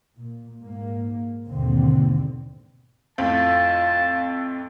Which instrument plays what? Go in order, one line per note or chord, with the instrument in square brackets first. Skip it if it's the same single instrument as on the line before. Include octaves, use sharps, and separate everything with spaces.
[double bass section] A#2
G#2 A#3
D#2 G#2 B2 D3 C4
[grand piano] F2 A2 [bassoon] F4 [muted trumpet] A5